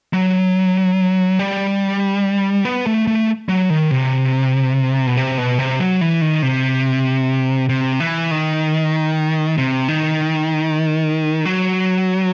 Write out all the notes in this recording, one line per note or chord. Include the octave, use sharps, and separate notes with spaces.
F#3
G3
B3
A3
A3
F#3
D#3
C3
B2
C3
B2
C3
F#3
E3
D#3
C3
C3
E3
D#3
C3
D#3
F#3